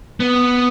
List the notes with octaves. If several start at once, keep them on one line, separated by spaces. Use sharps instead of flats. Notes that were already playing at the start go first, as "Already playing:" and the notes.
B3